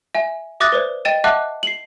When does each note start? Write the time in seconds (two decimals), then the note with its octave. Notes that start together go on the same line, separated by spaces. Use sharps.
0.15 E5 G#5
0.60 E5 D6 D#6 F#6 A6 A#6
0.72 B4 C5 D5
1.05 D#5 G5 A6 D#7 E7
1.24 D#5 E5 F#5 A5 D6 F#6
1.63 C7 F#7